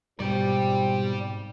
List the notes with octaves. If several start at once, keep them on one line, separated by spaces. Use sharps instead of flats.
G#2 B2 G3 C4 F4 G4 D5 G5